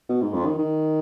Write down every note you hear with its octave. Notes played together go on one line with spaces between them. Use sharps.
B2
G#2
F2
D#3
D#3